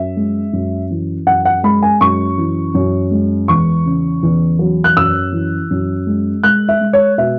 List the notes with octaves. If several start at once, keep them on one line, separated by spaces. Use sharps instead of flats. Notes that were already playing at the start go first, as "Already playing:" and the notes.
Already playing: F#2 E5
G#3
F#2
E3
F#2 F#5
F#5
G#3 B5
G#5
F#2 C#6
E3
F#2
G#3
E2 C#6
C#3
E2
F#3
F#6
F#2 E6
E3
F#2
G#3
G#3 F#6
E5
G#3
C#5
B2 E5